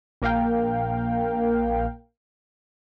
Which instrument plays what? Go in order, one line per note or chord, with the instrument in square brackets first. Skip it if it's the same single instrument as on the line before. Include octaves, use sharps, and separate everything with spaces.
[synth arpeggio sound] A#1 A#3 A#4 F5 G5